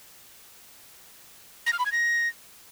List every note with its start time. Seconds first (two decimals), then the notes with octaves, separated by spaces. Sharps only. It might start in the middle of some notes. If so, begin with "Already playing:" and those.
1.66 A#6
1.73 F6
1.79 B5
1.86 G#6
1.92 A#6